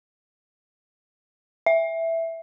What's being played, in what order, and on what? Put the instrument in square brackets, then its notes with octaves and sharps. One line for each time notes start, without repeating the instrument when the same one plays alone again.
[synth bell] E5